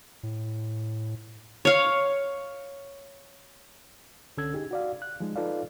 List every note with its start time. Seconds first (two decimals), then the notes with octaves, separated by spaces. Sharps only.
0.23 A2
1.65 C#5 F5
4.37 C2 D3 C#4 A4 E6 G#6
4.54 D#4 G4 G#4
4.71 F#4 D5 F5
5.02 F#6
5.20 F3 G#3 D#4
5.36 D#4 F4 A4 B4 D5 F5